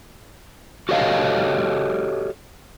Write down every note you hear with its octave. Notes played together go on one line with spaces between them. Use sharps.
F#4 G4 A4 C#5 D#5 F5